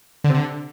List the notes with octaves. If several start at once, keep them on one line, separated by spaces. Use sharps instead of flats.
D3
C3
D3